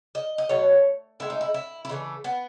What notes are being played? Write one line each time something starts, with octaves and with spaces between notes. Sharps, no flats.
D#5
D#5
B2 F#3 A3 C#5
A2 G#3 E4
D#4
E4
E4
E4
C#3 E3 A3 D#4
B3